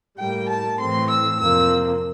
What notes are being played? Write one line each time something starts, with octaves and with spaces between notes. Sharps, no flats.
A2 G3 A#3 G5
A5
A2 E3 A3 C4 C6
E6
F2 C3 F3 A#3 E6